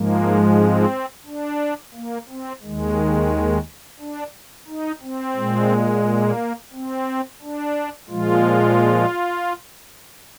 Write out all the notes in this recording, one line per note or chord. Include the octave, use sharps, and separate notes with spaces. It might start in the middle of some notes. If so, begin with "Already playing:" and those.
Already playing: G#2 F3 G#3 A#3
C4
D4
A#3
C4
D#2 D#3 G#3
D4
D#4
C4
A#2 G#3
A#3
C4
D4
A#2 F3 G#3 F4